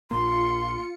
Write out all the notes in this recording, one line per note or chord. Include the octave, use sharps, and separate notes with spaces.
A#1 A#2 A#3 F4 C6 C#7